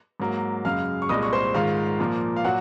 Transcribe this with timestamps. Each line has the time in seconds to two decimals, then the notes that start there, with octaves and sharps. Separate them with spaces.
0.20 G#2 F#3 A#3
0.65 F#2 C#3 G#3 F5 F6
1.02 C#6
1.09 C2 A#2 G#3 D#5 D#6
1.23 C#6
1.33 C5 C6
1.54 G#2 D#3 G#3 F4 F5
2.00 A#2 F3 A#3
2.36 F5
2.44 A#2 F#3 F#4 F#5